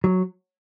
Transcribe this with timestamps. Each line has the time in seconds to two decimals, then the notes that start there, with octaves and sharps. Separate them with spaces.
0.04 F#3